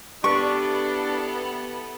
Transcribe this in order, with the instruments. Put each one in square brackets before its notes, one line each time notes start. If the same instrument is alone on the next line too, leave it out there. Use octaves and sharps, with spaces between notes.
[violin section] B3 E4 A4 [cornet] D4 [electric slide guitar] G4 B4 [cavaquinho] C#6